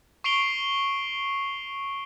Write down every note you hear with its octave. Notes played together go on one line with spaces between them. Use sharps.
C#6 C7 D7 F7 G7